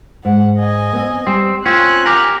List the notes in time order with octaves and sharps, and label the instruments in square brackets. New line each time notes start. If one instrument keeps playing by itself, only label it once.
[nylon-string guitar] G#2 [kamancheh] F#5
[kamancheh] D#5 G#5
[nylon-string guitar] B3 C4
[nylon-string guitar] G3 [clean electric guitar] C4
[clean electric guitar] C4 C#4 [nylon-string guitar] F4 [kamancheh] G#5 F#6
[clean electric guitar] G4 A#4